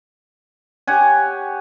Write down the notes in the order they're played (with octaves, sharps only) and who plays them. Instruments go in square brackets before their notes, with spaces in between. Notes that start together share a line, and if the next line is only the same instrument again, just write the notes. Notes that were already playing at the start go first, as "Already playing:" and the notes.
[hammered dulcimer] G4 C#5 F#5 G#5